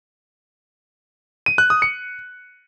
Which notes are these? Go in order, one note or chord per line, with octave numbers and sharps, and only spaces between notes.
D#7
F#6
D#6
C#7